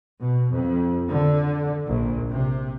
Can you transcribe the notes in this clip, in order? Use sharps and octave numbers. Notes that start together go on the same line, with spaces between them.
B2
F2
D3
A#1
C3